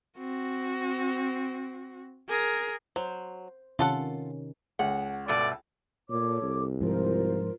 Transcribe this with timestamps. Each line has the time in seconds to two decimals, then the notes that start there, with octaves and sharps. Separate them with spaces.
0.18 C4 F#4
2.29 G#4 A#4
2.96 F#3 C5
3.79 C3 D#3 C#4 F4 A4 F#5
4.79 C#2 F#5
5.28 G2 B2 A3 D5
6.09 A#2 A4 C#5 D6
6.42 C2
6.81 G#2 F3 F4 A#4 C5